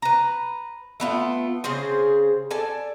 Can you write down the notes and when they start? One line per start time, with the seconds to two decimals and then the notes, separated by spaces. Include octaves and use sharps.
0.02 B4 A#5
1.00 A3 B3 D#4 F4
1.64 C#3 C4 G#4 C5
2.51 A4 D5 G#5 A5